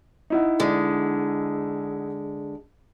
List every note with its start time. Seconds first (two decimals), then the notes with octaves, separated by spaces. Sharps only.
0.30 D#4 E4 F#5
0.60 D3 G#3